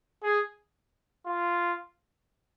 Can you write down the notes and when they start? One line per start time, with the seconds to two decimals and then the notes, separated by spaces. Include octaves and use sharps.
0.23 G#4
1.26 F4